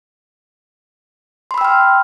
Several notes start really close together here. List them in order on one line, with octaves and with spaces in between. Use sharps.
C6 B5 E6 G5 F6